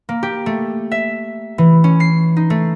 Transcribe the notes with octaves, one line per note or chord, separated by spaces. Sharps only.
A#3
G4
A3
E5
E3
C#4
C7
D#4
A3